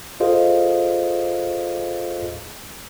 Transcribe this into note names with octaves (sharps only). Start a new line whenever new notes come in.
F4 G#4 A4 C5 D#5 F5